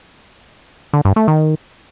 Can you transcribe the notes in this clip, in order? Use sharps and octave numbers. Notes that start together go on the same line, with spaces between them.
D3
G2
A3
D#3